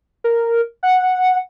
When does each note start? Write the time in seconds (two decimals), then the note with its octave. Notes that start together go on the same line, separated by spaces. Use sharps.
0.24 A#4
0.83 F#5